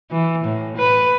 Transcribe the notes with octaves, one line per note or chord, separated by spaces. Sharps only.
E3
A2
B4